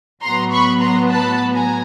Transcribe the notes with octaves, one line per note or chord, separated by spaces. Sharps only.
A2 F#3 B3 A#5 C6
B5 C#6
A#5 C6
A5 B5
G#5 A#5